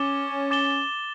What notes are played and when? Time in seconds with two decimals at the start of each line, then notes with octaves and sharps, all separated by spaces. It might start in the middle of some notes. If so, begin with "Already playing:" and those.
Already playing: C#4 D6 A6 E7 G7
0.51 D6 A6 E7 G7